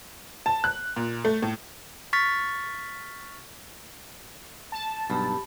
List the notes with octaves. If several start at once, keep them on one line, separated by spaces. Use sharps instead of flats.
A5
F#6
A#2
A3
A2
C#6 F6 A6 B6
A5
B1 G2 G4 B5